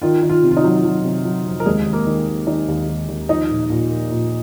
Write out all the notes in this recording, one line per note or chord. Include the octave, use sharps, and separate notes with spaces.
D#3 F4
D#3
F4
C3
F4
D#4
F#3
F#3
C3
F#3
F2
A#4
D#2 G#3 G#4
D#2
A#3 A#4
D#3
A#3
D#3 D#4 D#5
D#2
D#2
D#2
F3 D#4 D#5
A#2
A#2
A#3
A#2